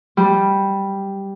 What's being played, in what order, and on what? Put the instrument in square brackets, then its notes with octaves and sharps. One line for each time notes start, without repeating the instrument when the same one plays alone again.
[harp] G3